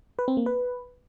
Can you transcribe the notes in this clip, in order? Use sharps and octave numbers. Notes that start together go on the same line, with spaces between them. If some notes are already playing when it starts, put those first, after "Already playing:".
B4
C4
A#3
B4